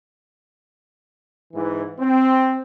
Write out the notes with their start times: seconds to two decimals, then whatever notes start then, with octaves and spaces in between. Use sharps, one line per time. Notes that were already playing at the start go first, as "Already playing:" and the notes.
1.53 G#2 E3
1.99 C4